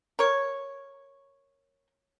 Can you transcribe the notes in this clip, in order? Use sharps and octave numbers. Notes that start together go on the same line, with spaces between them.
A#4 C#5